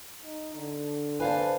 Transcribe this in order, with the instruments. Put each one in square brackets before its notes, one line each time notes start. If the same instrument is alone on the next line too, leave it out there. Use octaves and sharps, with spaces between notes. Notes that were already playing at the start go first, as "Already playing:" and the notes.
[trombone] D#4
D3
[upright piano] B4 D5 A5 [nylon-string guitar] C5 F5 G#5